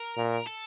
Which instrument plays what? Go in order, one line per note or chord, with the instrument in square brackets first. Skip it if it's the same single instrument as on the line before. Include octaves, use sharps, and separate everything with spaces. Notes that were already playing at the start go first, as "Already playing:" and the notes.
Already playing: [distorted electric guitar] A#4
[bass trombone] A#2
[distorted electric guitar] A4